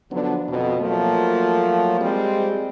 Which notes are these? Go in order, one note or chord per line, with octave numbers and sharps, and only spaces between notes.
D3 F3 F#3 B3 D4
F2 B2
F3 F#3 A3 A#3 F4
G3 G#3 C4 G4 G#4